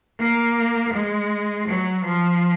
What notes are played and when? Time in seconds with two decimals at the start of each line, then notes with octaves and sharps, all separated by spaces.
0.19 A#3
0.94 G#3
1.68 F#3
2.05 F3